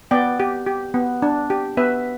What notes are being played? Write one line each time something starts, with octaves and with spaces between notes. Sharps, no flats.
B3 D5 G5
G4
G4
B3
D4
G4
B3 B4 E5